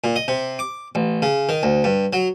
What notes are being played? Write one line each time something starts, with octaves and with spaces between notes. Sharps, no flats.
A#2
D#5
C3
D6
A1
C#3
D#3
D2
G2
F#3